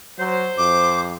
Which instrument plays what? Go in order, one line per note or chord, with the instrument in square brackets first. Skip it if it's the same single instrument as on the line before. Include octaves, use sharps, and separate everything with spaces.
[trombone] F#3 [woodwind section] C5
[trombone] F2 [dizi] D6